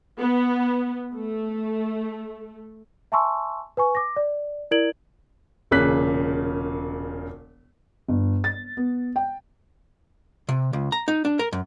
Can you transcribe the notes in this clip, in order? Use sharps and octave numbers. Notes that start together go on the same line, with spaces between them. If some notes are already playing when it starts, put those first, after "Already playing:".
B3
A3
E5 G#5 A5 C6 C#6 E6
B4 G#5 C#6
D6 A#6
D5
E4 A#4 D5 G#6 D7 F#7
E1 A#2 C#3 F#6 B6
G1
A6
B3
G5
C3
C#2
A#5
D#4
D4
A#4
F#2